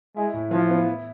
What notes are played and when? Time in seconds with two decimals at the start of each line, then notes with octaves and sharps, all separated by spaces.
0.16 G#3 E4
0.34 A2
0.51 E3 F3
0.69 B3
0.87 E4